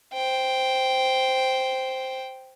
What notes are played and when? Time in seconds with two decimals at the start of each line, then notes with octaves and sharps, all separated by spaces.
0.13 C5 G5